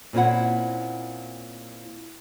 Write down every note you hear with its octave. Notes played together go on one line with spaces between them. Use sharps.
A#2 C4 C#4 E4 F#5